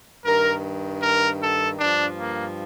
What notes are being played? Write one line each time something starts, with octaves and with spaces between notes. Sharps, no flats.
G2 D#3 A#4
A#4
A4
G2 F3 D4
A#3